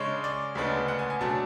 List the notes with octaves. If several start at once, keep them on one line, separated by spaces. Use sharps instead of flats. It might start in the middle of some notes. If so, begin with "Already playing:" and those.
Already playing: C#3 G#3 D4 C#5
D5
D2 C#3 G#3 B3 D4
F#5
G#5
G#5
B2 F#3 A3 D4 A5